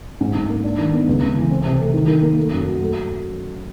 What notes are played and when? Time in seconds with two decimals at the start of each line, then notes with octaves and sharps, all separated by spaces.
0.21 G#2
0.35 G#2
0.50 A#3
0.64 D4
0.79 D#3
0.93 B3
1.07 C#2
1.21 C#2
1.36 E3
1.51 C4
1.65 C3
1.80 A3
1.94 D#3
2.08 D#3
2.22 A#3
2.37 A3
2.52 F#2
2.66 F#3
2.80 A3